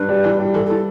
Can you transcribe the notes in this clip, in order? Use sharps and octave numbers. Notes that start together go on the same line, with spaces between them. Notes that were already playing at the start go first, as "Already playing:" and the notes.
Already playing: G2 B4
G3
E3
G3
E3 A4
E3 A4